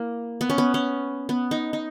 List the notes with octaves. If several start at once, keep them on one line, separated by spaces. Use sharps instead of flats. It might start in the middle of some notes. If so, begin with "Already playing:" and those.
Already playing: A#3 E4
B3
C#4
B3
C#4
B3
D#4
D#4